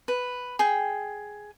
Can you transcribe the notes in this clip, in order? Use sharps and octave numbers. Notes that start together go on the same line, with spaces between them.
B4
G#4 G5